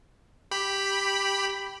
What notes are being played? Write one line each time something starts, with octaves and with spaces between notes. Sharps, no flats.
G4 B5